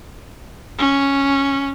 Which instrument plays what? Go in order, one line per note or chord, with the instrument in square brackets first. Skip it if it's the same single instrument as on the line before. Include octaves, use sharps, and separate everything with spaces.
[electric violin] C#4